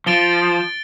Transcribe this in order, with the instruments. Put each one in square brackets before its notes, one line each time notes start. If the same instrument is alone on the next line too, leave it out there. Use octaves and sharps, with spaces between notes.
[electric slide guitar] F3 [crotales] A6 D7 G7